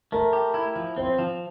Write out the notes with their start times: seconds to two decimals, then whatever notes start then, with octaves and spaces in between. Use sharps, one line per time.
0.12 A3 A#4
0.33 G4
0.54 E4
0.76 F3
0.96 C4 C5
1.19 F3